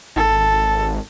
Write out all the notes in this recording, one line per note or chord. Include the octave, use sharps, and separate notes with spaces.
G#1 A4